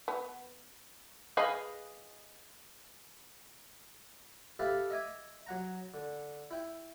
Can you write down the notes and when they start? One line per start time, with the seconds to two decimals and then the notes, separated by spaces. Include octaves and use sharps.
0.08 B3
1.37 G#4 B4 D#5 F5
4.59 G4 A4 B4 E5 F5 A5
4.90 D#5 E5 G#5 D6
5.46 F#3 F#5 A#5
5.94 D3
6.51 E4 G5